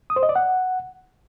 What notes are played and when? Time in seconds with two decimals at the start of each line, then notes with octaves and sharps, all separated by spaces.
0.10 D#6
0.16 C5
0.23 D#5
0.29 D5
0.35 F#5